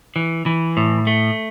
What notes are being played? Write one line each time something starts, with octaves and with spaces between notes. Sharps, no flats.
E3
E3
A2
A3